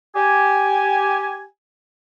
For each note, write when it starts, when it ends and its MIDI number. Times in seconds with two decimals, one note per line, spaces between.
0.16 1.45 67
0.16 1.45 80